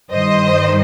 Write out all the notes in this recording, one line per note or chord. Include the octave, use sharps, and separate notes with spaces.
G2 D#3 C5 D#5